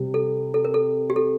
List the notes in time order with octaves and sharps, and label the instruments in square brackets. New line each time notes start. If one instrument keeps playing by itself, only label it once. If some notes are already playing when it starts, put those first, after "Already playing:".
Already playing: [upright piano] C3 G3
[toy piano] A4
A4
A#4
A4
G4
A4